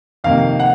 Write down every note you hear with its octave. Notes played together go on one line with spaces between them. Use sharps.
F2 C3 D#3 A#3 F5
F#5